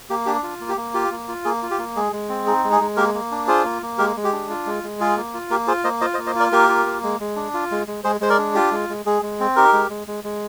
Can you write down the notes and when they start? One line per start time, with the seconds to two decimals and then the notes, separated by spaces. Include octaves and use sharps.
0.10 A#3 G4
0.26 D4 G4
0.43 F4
0.61 A#3
0.69 G4
0.77 A#3
0.94 F4 G4
1.11 A#3
1.28 F4
1.45 A#3 G#4
1.63 F4
1.71 G4
1.79 A#3
1.96 G#3 G#4
2.12 G#3
2.29 C4
2.47 D#4 G#4
2.64 G#3
2.72 G#4
2.81 G#3
2.97 A#3 G4 A#4
3.14 A#3
3.31 D4
3.47 F4 G#4 C5
3.64 A#3
3.82 A#3
3.98 G#3 G4 A#4
4.16 G#3
4.24 G4
4.33 D4
4.50 F4
4.66 G#3
4.84 G#3
5.00 F4 G#4
5.17 A#3
5.34 F4
5.50 A#3 G4 A#4
5.67 F4 G#4 C5
5.84 A#3 C5 D#5
6.01 F4 C5 D#5
6.14 C5 D#5
6.18 A#3
6.27 C5 D#5
6.35 F4 A#4 D5
6.52 A#3 G4 A#4
6.69 F4
6.86 A#3
7.03 G#3
7.20 G#3
7.36 D4
7.54 F4
7.71 G#3
7.87 G#3
8.04 G#3 G#4 C5
8.21 G#3 C5
8.30 A#4 D5
8.38 D4
8.55 F4 G4
8.71 G#3
8.89 G#3
9.06 G#3 G#4
9.22 G#3
9.40 C4
9.56 D#4 G4 A#4
9.73 G#3
9.90 G#3
10.08 G#3
10.24 G#3